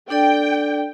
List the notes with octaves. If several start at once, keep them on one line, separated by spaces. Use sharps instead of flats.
D4 A4 D5 G5